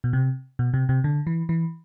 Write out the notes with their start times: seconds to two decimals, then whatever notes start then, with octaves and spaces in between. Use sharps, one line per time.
0.04 B2
0.13 C3
0.59 B2
0.74 C3
0.89 C3
1.04 D3
1.27 E3
1.49 E3